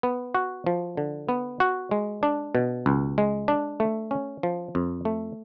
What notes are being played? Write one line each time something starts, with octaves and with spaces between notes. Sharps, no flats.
B3
F#4
F3
D3
B3
F#4
G#3
D4
B2
C#2
G#3
D4
A3
C#4
F3
F2
A3